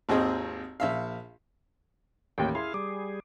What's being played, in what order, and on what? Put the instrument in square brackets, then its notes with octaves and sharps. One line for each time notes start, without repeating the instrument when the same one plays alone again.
[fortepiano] G#1 D#2 C4 G#4 D#5
A#1 E5 F5
[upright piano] A1 D#2 [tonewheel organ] G5
[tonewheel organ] E4 G#4 F5 [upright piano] C6
[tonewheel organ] G3 G#4 [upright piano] D6